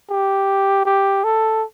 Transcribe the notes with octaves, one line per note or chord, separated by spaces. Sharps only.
G4
G4
A4